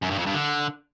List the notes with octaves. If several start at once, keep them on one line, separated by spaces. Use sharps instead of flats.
F#2
G2
F2
G2
D3